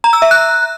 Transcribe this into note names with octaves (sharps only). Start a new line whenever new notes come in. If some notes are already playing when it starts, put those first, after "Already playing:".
A#5
E6
E5
F#6